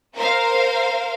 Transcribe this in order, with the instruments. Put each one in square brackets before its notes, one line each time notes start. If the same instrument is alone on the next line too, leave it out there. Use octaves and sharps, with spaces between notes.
[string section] A#4 C5 F5